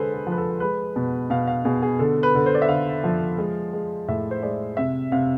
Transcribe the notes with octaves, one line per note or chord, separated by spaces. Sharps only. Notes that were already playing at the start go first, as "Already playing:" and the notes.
Already playing: D3 G#3 G#4 A4 B4 C5
A4
F3
B4
A4
G#3 B4
B2
B2 F5
F5
B2 G#4
G#4
D3 A4
B4
D3
C5
D5
E5
D3 F5
F3
G#3
G#3
A2 E5
C5
G#3 D5
C3 E5
C3 F5